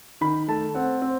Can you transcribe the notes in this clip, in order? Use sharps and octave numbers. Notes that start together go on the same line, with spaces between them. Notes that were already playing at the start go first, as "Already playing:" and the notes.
D#3 B5
A3 A5
C4 F#5
C4